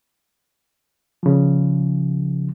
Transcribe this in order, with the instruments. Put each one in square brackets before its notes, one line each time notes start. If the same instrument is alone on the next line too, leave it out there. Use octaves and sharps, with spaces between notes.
[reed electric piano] C#3 F3